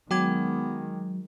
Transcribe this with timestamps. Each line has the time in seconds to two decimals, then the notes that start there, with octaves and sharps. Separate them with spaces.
0.11 D#3 F#3 G#3 B3 G5 D6 G#6